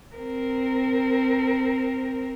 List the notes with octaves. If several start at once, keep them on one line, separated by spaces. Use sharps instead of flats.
C4 A#4